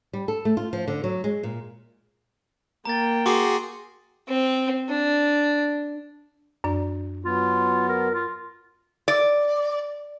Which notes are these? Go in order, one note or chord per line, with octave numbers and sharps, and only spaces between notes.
G3
A4
A3
F4
F3
D3
F#3
G#3
A#2
A#3 G5 A#5 A6
F#4 G#4 C6 D6 C7
C4
D4
F#2 D4 D5
F#3 B3 F4
A#4
F4
D5